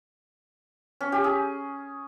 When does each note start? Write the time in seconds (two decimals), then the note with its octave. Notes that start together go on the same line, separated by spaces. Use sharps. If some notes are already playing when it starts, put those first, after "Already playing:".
1.01 C#4
1.12 G4
1.24 G#4